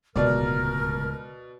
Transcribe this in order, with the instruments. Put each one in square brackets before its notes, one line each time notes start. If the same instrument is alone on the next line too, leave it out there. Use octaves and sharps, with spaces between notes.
[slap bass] D1 G#3 [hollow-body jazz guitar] C#2 [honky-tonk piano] B2 D5 [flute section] A#4 F6